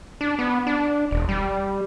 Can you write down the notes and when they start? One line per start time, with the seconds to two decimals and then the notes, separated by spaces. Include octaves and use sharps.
0.21 D4
0.39 B3
0.67 D4
1.11 E1
1.29 G3